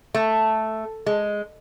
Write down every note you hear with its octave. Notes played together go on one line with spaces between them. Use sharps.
A3
G#3